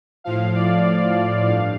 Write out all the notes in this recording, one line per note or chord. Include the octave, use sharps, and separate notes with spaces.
A2 F3 F5
D5
G2 F5